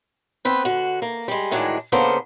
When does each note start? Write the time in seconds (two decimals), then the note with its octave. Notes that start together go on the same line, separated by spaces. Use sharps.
0.45 B3 C4 B4 G5
0.65 D3 F#4
1.02 A#3
1.28 G3 G#3
1.51 A2 D#3 E3 F#3 G#3 D4
1.92 C#3 A#3 B3 D4 A4 C5